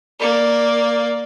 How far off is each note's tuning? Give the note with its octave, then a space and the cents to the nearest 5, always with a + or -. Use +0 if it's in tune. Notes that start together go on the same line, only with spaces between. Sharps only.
A#3 +0 D5 +0